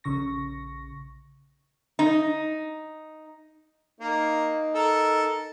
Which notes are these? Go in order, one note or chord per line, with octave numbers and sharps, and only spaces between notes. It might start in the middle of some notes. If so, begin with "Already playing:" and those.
A#1 C#3 C#6 A#6
D#4
A#3 D#4
A4 A#4